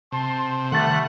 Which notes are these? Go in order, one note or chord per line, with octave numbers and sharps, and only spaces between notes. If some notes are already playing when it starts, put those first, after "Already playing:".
C3 A5 C6
D#3 G3 A3 F#5 A6